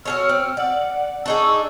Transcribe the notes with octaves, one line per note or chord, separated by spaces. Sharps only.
F#4 G#4 C#5 E6 F6
C4
D5 F#5
D4 D#4 G#4 C#6 E6